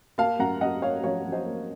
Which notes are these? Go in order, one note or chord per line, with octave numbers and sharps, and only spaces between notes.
A#3 F5 A5
F#2 F#5 A#5
F#2 D#5 F#5
A#3 C#5 F5
F3 C#5 F5
F3
C5 D#5
A#3